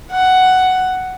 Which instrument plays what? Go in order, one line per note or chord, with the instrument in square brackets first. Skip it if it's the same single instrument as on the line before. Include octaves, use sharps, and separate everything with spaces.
[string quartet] F#5